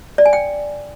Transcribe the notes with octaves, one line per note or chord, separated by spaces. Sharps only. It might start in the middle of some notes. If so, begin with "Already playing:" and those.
D5
G#5
G5